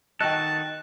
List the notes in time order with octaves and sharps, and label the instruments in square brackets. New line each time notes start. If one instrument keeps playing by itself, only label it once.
[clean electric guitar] D#3 F#4 A4 [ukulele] D#5 G5 [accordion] A5 [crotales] F#6